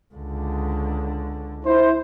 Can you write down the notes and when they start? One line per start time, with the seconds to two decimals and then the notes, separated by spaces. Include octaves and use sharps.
0.15 C#2 D3
1.65 E4 C5